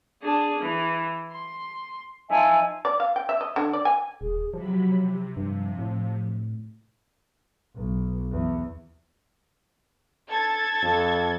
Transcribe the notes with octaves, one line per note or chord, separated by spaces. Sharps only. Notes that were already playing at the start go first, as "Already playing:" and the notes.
D4 G#4
E3
C6
F3 D#4 E5 G#5
D5
F5
G5
E5
D#5
D3
D5
G#5
D#1 G#4
C3 F3 F#3 G4 B5
C3
G2 F3
A2
B1
E2
A4 G#6 A6
F2